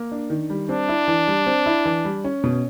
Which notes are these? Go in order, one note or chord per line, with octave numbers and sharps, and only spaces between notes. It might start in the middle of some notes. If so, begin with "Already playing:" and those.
Already playing: A#3
D4
D#3
G3
C4 D4
E4
E3
G3
C4
E4
E3
G3
C#4
B2